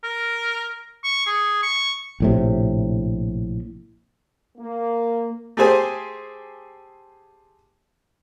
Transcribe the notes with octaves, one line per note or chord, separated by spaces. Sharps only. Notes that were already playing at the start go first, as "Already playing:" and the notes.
A#4
C#6
G#4
C#6
A#1 A2 C3
A#3
A3 G4 G#4 C5 G#5